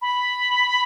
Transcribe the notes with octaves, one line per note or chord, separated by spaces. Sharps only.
B5